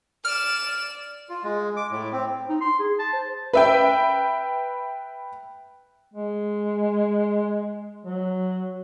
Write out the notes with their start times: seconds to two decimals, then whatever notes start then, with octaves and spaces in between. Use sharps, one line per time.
0.25 D5 F6 E7
1.29 F4
1.44 G#3
1.77 D6
1.90 A2
2.12 C4
2.49 D#4
2.61 C6
2.80 G#4
2.99 A5
3.13 C5
3.53 B4 E5 G5
6.14 G#3
8.06 F#3